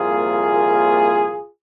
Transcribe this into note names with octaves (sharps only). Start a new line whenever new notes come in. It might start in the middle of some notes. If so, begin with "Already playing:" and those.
Already playing: C2 A#2 F3 A#3 F4 G#4